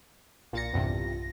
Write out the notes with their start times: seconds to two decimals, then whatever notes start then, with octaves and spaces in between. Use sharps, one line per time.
0.53 B1 A#2 F4 A6 A#6 C#7
0.73 E2 G2 C3